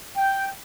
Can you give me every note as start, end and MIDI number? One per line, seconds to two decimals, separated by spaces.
0.16 0.48 79